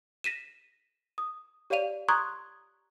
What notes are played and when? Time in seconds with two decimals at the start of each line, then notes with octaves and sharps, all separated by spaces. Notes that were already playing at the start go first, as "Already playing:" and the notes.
0.24 A#6 B6 D#7 E7
1.18 D#6
1.70 G4 C#5 D5 F5 D#7 F7
2.08 A#5 C6 C#6 D#6 F#6 G#6